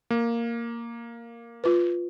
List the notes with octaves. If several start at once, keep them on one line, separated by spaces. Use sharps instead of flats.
A#3
F4 B4